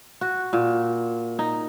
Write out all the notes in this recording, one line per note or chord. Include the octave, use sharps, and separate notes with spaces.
F#4
A#2
D#4